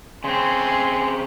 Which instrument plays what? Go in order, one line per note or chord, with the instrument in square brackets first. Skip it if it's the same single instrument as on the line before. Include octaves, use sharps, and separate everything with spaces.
[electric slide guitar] C#3 C4 [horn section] G#5 C6